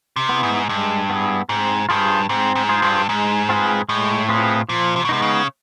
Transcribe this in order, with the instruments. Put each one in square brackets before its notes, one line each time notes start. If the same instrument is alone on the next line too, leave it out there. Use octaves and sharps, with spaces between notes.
[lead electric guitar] C3
[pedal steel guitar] B3 E4 G#4
[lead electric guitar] G#2
[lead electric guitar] G2 [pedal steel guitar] G#3
[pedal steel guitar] B3 E4 G#4
[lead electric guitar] G#2 [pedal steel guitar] C4
[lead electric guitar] G2 [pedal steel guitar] F4 G#4 C5
[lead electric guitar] G#2 [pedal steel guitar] C4
[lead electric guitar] G#2
[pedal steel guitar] F4 G#4 C5
[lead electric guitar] G2
[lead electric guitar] G#2 [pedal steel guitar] G#3
[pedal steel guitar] C4 F4 G#4 B4
[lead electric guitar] A2 [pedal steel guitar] G#3
[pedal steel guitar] C4 F4 G#4 B4
[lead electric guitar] A#2 [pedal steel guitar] F3
[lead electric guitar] C3
B2
[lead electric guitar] C3 [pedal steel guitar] G#3 B3 D#4
[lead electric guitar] C#3